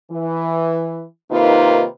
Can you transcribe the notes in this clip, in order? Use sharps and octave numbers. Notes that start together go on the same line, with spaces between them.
E3
C3 D#3 A#3 D#4 F4 B4